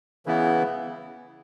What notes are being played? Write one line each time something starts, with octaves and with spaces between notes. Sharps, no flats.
C#3 E3 B3 E4